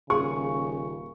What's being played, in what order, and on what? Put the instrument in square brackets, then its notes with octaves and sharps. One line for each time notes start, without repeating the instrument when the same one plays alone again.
[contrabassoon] D#1 [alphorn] C#3 [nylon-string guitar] G#4 [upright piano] C#6